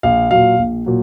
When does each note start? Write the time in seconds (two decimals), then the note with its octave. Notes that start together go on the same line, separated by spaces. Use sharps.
0.03 A#1 F5
0.31 A#2 F#3 F5
0.59 A#1
0.86 A#2 F#3